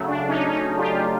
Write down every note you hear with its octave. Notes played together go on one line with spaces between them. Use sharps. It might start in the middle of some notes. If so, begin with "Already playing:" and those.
Already playing: C#3 F#3 A3
D4
C#4 D#4
C#4 D#4
F4 G4